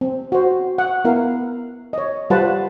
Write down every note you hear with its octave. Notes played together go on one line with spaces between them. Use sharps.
C4
F#4 C5
F#5
B3 E4 A#4 F5
C#5 D#5
G3 F4 B4 C5 F#5 A5